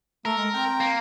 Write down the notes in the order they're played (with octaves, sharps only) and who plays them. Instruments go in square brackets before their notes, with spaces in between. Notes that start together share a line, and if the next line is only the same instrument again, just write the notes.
[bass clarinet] A3 [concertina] A4 [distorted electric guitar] A#4
[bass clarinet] G#3
[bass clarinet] C4 [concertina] G5 A#5
[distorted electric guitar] A#3